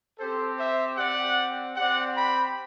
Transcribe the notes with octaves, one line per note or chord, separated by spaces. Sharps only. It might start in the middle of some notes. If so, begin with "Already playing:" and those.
C4 G4 A4 C5
C5 E5
C4 G4 D5 F#5
C4 G4 D5 F#5
G5 B5